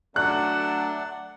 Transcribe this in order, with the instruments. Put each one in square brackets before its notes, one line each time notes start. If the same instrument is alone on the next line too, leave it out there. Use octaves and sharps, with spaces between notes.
[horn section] F#3 A3 D4 [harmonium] D5 F#5 [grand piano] F#6